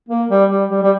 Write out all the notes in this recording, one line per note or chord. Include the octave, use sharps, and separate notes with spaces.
A#3
G3
G3
G3
G3